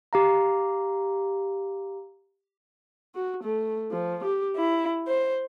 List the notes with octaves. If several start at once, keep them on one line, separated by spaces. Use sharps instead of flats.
G4 F5 A#5
F#4
A3
F3
G4
E4
C5